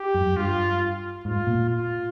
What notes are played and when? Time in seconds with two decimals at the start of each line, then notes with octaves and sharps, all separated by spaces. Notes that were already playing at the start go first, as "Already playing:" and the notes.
Already playing: G4
0.14 F#2
0.36 G2 F4
1.24 G#2 F4
1.47 A#2
1.69 F4